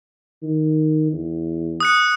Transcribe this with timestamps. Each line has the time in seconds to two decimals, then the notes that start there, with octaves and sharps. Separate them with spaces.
0.43 D#3
1.12 E2
1.80 D#6 F#6 C#7